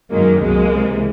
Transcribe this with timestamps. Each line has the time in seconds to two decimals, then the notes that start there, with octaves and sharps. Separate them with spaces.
0.11 F#2 D#3 F#3 G#3 A#3
0.39 C2 B2 F#3 G#3 A#3
0.69 C#2 C3 E3